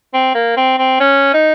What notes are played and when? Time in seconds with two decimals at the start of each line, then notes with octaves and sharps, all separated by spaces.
0.14 C4
0.35 A#3
0.57 C4
0.78 C4
1.00 C#4
1.33 D#4